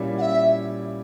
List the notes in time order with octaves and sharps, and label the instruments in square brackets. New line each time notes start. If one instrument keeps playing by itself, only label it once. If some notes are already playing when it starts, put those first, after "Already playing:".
Already playing: [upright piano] A#2 G3 C#4 E4
[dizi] F#5
E5